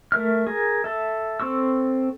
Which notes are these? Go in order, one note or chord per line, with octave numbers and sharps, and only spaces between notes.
A3 A#4 E5 F6
G#4 A#4
A4 E5
C4 A4 C#6 E6